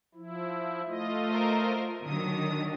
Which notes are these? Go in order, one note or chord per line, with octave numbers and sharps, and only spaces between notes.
F3 E4
A3 F4 D#5
A#4 C5
D3 D#3 F#3 D#6